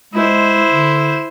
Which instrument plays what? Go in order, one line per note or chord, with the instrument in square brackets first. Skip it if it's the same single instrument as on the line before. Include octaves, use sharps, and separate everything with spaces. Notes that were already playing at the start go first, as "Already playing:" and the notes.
[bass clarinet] G#3 [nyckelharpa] E4 C5
[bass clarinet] D3